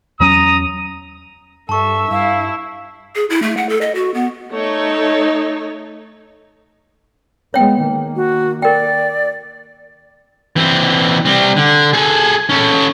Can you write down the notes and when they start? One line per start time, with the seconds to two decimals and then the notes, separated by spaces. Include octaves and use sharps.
0.20 E2 F#3 C#4 A#5 D#6
1.69 G2 A4 E5 A5 C#6
2.11 G2 E4 F5
3.16 G#4
3.30 E4
3.42 A3
3.57 F#5
3.69 A4
3.81 D#5
3.95 F#4
4.14 B3
4.51 A3 D#4 C#5
7.54 G#3 B3 C#5 G5
7.83 D#3 A#3
8.16 F#4
8.62 A#4 D5 G5
10.56 E3 C4
11.25 G3 C4
11.56 D3
11.93 G#4 A4
12.49 C#4 A4